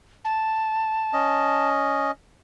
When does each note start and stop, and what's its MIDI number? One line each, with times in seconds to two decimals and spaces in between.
0.25 1.69 81
1.13 2.11 61
1.13 2.11 75